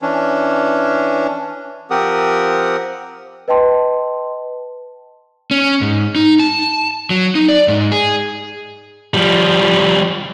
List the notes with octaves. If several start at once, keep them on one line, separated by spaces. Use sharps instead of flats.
E3 C#4 D4
F3 C4 G4 A#4 F#5 D#6
B4 D#5 G5 A5 C6
C#4
G#2
D#4
A5
F#3
D#4
D5
G#2
G#4
F3 G3